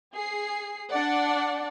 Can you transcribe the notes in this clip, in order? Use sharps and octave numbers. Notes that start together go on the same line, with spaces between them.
G#4 C7
D4 D5 F#5